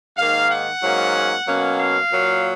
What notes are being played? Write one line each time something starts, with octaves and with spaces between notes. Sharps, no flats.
G#2 D#3 A#3 F5
F#5
G#2 F#3 A#3 C#4
B2 F#3 A#3 C#4
F5
A#2 F#3 A#3